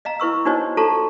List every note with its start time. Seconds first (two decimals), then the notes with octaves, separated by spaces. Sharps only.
0.05 D#5 F5 A#5
0.20 E4 B4 C#6 E6
0.45 D4 D#4 F#4 C5 C#5 D#5
0.77 F4 F#4 A4 A5 A#5 C#6